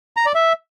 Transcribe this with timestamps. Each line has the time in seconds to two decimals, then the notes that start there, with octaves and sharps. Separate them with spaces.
0.17 A#5
0.26 D5
0.35 E5